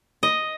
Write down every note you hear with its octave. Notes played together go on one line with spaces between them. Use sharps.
D#5